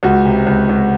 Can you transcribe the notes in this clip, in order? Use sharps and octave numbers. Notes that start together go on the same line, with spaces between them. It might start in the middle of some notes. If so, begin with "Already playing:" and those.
C#2 F#4
C3
C#2
C#2